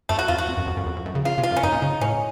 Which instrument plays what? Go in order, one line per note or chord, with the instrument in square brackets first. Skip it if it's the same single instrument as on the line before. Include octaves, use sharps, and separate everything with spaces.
[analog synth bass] F#2 [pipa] A3
[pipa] F#4
[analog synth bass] F2 [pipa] F4
[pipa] F#4
[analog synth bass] F2
F#2
F2
F#2
F2
F2
F#2
C#3
[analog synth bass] C#3 [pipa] F4
[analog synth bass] C3
[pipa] F4
[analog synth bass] F#2
[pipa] C#4
[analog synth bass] F#2 [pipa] D#4
[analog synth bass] A#2
C#3
[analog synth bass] A2 [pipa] C#4